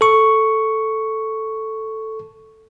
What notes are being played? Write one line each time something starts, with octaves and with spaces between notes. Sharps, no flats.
A4 C#6